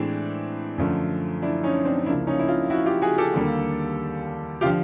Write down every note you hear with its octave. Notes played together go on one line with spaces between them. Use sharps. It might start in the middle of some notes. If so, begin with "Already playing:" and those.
Already playing: A2 E3 G#3 C4 D4
F#2 D3 F3 A3
D4 E4
C#4 D#4
C4 D4
C#2 C#3 F3 A#3 D4 E4
C#4 D#4
E4
D#4 F4
E4 F#4
F4 G4
F#4 G#4
G4 A4
D#2 D3 G3 A#3
D3 F3 F4 G4